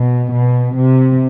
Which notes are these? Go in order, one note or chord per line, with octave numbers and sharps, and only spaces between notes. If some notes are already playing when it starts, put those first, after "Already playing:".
Already playing: B2
B2
C3